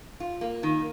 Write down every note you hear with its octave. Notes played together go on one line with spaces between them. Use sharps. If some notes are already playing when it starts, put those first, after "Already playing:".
F4
A#3
D#3